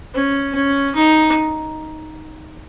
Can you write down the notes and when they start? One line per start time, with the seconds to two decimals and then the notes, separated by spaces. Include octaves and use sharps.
0.14 C#4
0.55 C#4
0.95 D#4